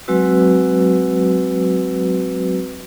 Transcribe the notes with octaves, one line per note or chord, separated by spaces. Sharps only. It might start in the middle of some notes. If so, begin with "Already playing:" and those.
F#3 G#3 C4 F#4 B4 E6